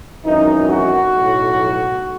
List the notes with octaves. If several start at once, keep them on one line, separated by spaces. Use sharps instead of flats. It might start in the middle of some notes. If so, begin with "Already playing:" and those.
G#1 F#2 E3 D#4
F#4
B1 A2 F#3